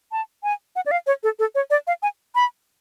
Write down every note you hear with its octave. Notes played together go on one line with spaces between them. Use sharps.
A5
G#5
F#5
D5
F5
C#5
A4
A4
C#5
D5
F5
G#5
B5